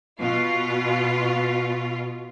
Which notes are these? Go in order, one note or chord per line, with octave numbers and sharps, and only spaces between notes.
B2 F4